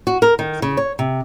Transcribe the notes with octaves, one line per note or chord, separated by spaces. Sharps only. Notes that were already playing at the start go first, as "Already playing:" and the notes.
F#4
A#4
D#3
C#3
C#5
C3